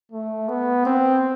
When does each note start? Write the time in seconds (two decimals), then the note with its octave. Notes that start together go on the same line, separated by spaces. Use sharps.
0.12 A3
0.48 B3
0.85 C4